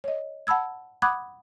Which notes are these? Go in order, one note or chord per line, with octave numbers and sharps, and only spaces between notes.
C#5 D#5
F#5 A5 B5 E6 G#6
F#5 B5 D6 D#6 F#6 G#6